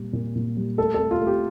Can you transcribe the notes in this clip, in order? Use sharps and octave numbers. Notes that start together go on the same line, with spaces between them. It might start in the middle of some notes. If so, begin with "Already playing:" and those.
Already playing: A#2 G3
A#2
A#2
G3
A3 A4
A4
A3
F4
A3
G4